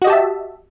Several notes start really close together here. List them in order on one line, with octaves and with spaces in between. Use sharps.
F#4 D#5 G4 A5 E5